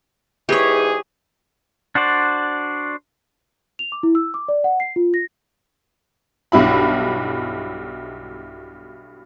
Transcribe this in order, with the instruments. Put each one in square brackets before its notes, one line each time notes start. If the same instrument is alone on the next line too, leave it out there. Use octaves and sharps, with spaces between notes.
[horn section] G#2 E3 G#4 [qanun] G4 C#5
[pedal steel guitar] D4 F#4 C5 D5
[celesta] F7
D6
E4
E6
D6
D5
F#5
C7
F4
A#6
[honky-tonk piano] B1 G2 E4 B5